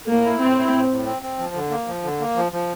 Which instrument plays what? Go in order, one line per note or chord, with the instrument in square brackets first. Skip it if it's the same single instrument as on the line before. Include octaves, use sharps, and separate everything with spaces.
[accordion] A2 [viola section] A#3
[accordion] E4
[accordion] A2 [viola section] C4
[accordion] E4
A2
A2
C4
C4
F3
D3
A#3
F3
D3
A#3
F3
F3